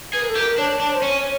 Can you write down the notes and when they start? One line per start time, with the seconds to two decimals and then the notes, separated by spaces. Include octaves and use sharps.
0.13 G#4 B4
0.22 A#4
0.29 A4
0.35 G4 A#4
0.58 D4 C#5
0.80 D4
0.94 C5
1.02 C#4 C#5